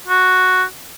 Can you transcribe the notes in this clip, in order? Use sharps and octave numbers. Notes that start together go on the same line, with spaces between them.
F#4